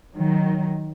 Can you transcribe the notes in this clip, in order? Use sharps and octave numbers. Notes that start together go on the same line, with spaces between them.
D#3 F#3